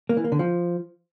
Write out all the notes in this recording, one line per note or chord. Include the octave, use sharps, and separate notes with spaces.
A#3
E3
A#3
D3
F3